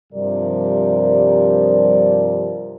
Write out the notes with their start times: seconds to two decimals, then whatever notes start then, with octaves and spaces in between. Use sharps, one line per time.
0.13 G2 C3 F3 G3 A#4 D5